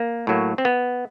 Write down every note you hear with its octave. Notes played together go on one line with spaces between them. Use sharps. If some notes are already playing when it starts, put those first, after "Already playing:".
Already playing: A#3
A2 F#3 A#3
C4
B3